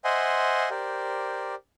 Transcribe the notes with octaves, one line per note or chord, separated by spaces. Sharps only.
C5 D#5 E5 F#5 G#5 C6
G4 A#4 C5 D5